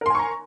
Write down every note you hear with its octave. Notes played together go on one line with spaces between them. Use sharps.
A#4 G#5 A#5 C6 C#6